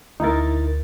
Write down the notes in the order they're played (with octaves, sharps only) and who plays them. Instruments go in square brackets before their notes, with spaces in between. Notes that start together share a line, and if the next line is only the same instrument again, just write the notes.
[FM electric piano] D2 A6 [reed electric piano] D#4 E4 A#4